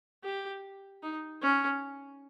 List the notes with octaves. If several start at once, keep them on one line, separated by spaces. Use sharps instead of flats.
G4
D#4
C#4